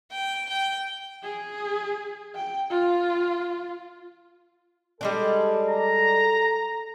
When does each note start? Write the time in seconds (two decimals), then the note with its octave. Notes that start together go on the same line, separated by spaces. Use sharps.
0.11 G5
0.49 G5
1.23 G#4
2.35 G5
2.70 F4
5.01 G3 G#3 D4 A4
5.69 A#5